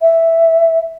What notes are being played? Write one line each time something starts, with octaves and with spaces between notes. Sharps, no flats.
E5